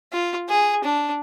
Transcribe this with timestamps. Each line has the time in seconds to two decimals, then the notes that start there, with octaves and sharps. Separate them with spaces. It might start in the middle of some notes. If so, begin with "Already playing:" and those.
0.12 F4
0.48 G#4
0.84 D4